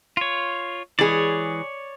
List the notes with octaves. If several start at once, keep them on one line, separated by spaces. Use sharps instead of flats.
F4 C#5
E3 G#3 G#4 C#5 D5